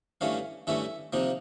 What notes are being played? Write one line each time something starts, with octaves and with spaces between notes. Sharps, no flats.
G2 E3 A3 C#4 F5
G2 E3 A3 C#4 E5
C3 F3 A#3 D#4